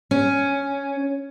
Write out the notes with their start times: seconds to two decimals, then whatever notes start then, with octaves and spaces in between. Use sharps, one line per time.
0.11 C#4